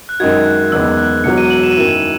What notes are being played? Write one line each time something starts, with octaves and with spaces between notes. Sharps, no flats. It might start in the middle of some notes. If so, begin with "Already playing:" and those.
F#6
F#2 D#3 G#3 D#4 F#4 G#6
F#6
F#1 E2 D#3 G#3 B3 E6
F#6
E1 E2 B2 F#3 C#7
D#7
F#7
E7
D#7
F#2 D#3 A#3 E4 E7